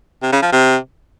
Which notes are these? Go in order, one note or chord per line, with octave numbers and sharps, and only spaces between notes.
C3
C#3
F3
C3